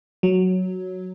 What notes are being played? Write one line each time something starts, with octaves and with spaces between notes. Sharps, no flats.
F#3